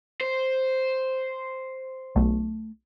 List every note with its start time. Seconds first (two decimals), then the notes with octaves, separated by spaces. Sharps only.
0.21 C5
2.16 B1 A3